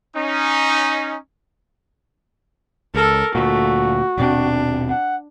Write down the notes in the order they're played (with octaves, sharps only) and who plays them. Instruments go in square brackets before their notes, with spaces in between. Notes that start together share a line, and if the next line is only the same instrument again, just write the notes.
[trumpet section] C#4 D#4
[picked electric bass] C#2 [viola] A4 A#4
[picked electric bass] D2 A#2 [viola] A3 [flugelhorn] F#4
[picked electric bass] D#1 B2 C4 [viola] D4
[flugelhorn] F#5